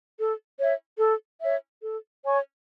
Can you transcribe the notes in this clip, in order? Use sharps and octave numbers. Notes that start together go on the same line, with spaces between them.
A4
C#5 E5
A4
C#5 E5
A4
C#5 G#5 C#6